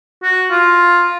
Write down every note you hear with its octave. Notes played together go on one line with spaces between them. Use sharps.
F#4
F4